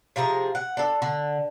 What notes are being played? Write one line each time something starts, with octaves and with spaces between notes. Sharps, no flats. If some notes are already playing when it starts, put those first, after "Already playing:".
C3 F3 G#4 A#5
F#5
D4 A4
D3